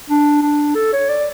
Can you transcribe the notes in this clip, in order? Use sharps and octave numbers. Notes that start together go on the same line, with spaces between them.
D4
D4
A4
C#5
D5